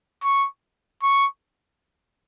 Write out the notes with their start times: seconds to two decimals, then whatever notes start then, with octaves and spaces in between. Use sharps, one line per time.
0.23 C#6
1.03 C#6